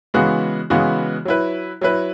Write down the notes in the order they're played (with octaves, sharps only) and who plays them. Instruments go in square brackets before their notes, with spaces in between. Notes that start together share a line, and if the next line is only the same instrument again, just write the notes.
[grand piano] C#3 E3 G#3 B3 F#4
C#3 E3 G#3 B3 F#4
F#3 E4 B4
F#3 E4 B4